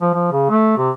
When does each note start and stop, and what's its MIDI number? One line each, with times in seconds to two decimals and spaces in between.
0.01 0.10 53
0.14 0.28 53
0.32 0.45 49
0.49 0.75 57
0.77 0.91 48